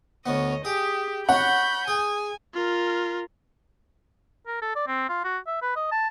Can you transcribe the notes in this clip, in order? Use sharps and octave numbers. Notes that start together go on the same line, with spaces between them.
D2 B3 C#5 D#5
G4 G#4
F#4 C#5 F#5 B5 G6
G#4 G#5
F4 A#4
A#4
A4
D5
C4
F4
F#4
E5
B4
D#5
A5